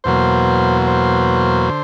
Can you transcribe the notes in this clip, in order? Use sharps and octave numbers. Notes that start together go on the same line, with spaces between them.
E2 B2 F#3 A#3 C5
C5
D3